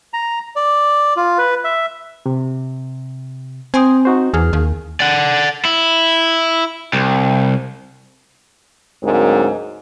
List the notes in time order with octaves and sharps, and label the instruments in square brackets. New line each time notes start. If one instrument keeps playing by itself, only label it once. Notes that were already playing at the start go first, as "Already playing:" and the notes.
[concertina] A#5
D5
F4
B4
E5
[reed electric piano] C3
[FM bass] C4 [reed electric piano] G#5 C6 D#6
[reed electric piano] D#4 F#4 C5
[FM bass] E2 [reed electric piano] G#4 F6
[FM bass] D#2
[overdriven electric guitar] D5 F#5
E4
C2
[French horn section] D2 G#2 F#3 A#3 C4